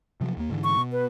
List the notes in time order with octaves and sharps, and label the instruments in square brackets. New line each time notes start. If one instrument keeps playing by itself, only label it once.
[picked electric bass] C3 F3 F#3
D#2 A#3
G#2 D3 E3
[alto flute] C#6
[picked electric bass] B2
[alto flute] B4